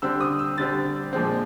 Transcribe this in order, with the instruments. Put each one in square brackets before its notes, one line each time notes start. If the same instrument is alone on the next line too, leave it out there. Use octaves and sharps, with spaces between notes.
[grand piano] D3 G3 C4 E6
D#6
E6
D3 G3 C4 A6
A#2 F3 G#3 C4